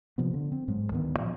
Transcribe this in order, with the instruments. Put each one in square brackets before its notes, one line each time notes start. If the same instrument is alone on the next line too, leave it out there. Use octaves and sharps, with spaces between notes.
[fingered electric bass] C3 F3 B3
D3
C4
G#2 F#3 G#3
D2 D#3 B3
A#2 F3